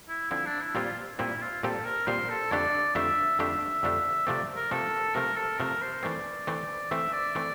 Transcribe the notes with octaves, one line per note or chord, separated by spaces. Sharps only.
E4
D3 F3 C4 E4
D4
E4
A#2 G3 C4 F4 G4
A#2 G3 C4 E4 G4
F4
A#2 G3 C4 G4 A4
A#4
A#2 G3 C4 G4 C5
A4
F2 D3 A3 D4 G4 D5
F2 D3 A3 D4 G4 E5
F2 D3 A3 D4 G4 E5
F2 D3 A3 D4 G4
C3 F3 A3 C4 D5
A#4
C3 F3 A3 C4 A4
C3 F3 A3 C4 A#4
A4
C3 F3 A3 C4 A#4
C5
E3 A3 C4 D5
E3 A3 C4
E3 A3 C4 E5
D5
E3 A3 C4